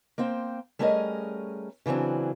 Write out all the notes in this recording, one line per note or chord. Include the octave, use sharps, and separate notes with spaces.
A#3 C4 C5 G5
G3 A3 C#4 G#4 A#4 D#5
C#3 E3 F#3 C4 D4